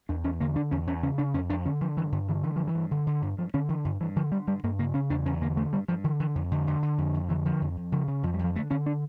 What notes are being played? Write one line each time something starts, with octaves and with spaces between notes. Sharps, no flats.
E2 D4
E2 C#4
D3 A#3
D3 D4
E2 C#4
E2 C#4
C#3 C#4
C#3 D4
F2 C#4
F2 D4
D3 C#4
D3 F3
G2 E3
G2 D3
D3 E3
D3 E3
G2 F3
E3
G2
D3
D3
G2 D3
G2 F3
D3 C#4
D3 E3
G2 D3
G2 E3
D3 F3
D3 G3
G2 G3
G2 A#3
C#3 A#3
C#3 C#4
E2 D4
E2 C#4
D3 A#3
D3 A3
G2 G3
G2 F3
D3 E3
D3 E3
F2 D3
F2 D3
D3
D3
F2
F2
D3 E3
D3 F3
F2
F2
C#3 F3
C#3
F2 F3
G3
F2 F3
D3 A3
D3 C#4
D4